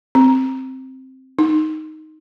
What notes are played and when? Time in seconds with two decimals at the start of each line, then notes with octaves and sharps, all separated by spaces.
0.15 C4
1.39 D#4